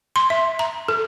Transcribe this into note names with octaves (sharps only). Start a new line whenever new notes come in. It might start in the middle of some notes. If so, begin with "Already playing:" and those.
C6
E5
A#5
A4